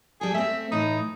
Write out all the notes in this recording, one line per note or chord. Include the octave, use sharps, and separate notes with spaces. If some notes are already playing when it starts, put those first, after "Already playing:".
G3 G#4 A4
A3 C4 E5
A2 E3 D#4